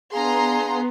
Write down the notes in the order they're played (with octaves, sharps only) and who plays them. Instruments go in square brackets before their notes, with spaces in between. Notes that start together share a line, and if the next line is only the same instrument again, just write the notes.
[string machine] B3 [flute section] D4 G#4 F5 [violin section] A#5 C6